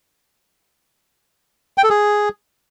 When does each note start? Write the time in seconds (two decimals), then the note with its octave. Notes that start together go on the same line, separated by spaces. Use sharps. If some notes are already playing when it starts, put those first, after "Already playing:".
1.78 G5
1.84 A4
1.90 G#4